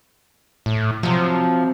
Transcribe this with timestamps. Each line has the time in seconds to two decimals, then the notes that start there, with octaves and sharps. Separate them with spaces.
0.66 A2
1.03 C3 F3 F#3